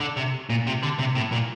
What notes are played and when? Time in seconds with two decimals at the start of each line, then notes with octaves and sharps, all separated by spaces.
0.01 D3
0.17 C3
0.50 A#2
0.67 C3
0.83 D3
1.00 C3
1.16 A2
1.33 A#2